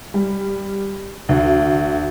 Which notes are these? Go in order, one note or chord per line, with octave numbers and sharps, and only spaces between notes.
G3
D2